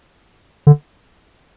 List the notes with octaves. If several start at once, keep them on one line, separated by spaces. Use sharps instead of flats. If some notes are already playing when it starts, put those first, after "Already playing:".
D3